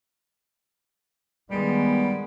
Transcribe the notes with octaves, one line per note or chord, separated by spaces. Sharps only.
D#3 G3 G#3 B3